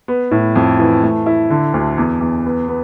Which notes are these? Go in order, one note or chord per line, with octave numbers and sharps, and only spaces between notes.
B3
A2
F2
E3
A3
E4
D3
D2
E2
E2
B3
B3